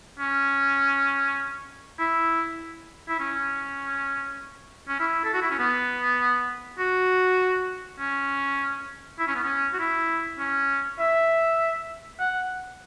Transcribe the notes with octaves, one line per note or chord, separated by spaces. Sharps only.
C#4
E4
E4
C#4
C#4
E4
A4
F#4
E4
C#4
B3
F#4
C#4
E4
C#4
B3
C#4
F#4
E4
C#4
E5
F#5